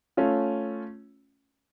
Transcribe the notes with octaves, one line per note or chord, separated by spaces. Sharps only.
A3 C#4 F4